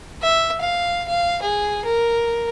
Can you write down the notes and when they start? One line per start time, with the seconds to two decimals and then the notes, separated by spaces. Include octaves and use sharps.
0.22 E5
0.61 F5
1.09 F5
1.42 G#4
1.85 A#4